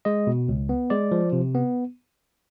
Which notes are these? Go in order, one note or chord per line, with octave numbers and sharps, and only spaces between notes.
G#3 D#5
B2
C#2
B3
G#3 D5
F3
C3
B3